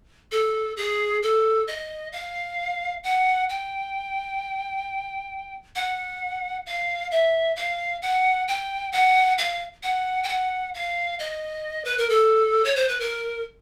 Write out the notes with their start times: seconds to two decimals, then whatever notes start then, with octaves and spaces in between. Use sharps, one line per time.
0.32 A4
0.77 G#4
1.23 A4
1.68 D#5
2.13 F5
3.04 F#5
3.49 G5
5.75 F#5
6.66 F5
7.11 E5
7.56 F5
8.02 F#5
8.48 G5
8.92 F#5
9.38 F5
9.83 F#5
10.23 G5
10.29 F#5
10.74 F5
11.19 D#5
11.85 B4
11.98 A#4
12.09 A4
12.65 C#5
12.76 C5
12.89 B4
13.00 A#4